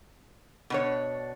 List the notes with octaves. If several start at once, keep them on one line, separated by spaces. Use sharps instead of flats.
B2 D4 C#5